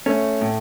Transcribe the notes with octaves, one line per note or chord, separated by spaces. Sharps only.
A3 C#4
A2